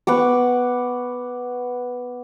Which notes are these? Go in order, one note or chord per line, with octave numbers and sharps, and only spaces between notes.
B3 F#5 C#6 D6